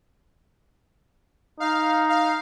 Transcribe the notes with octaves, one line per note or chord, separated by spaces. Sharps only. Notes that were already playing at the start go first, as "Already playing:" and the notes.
D#4 F5
F5